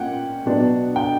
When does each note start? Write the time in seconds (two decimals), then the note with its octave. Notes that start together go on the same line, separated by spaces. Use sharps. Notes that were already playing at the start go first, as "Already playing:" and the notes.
Already playing: A#2 A#3 C#4 F#5 G5
0.46 B2 F#3 B3 D4
0.96 G5